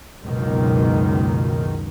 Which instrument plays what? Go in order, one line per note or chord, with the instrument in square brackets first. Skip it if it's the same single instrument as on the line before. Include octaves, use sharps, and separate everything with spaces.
[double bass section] F#1 C#2 F#2 B2 D#3